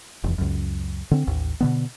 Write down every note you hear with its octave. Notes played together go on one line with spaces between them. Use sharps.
F1 E2
C#2 F#2
D3 C4
A1 D#2
B2 D3 B3